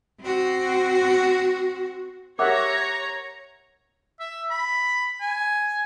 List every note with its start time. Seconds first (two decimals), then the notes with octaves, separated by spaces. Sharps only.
0.21 C4 F#4
2.39 G4 A#4 C#5 E5 F#5 A#5 D6
4.20 E5
4.51 B5
5.21 G#5